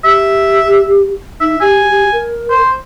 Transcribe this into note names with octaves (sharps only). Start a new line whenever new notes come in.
G4 E5
D#4 E5
G4 G#5
G4
A#4
C5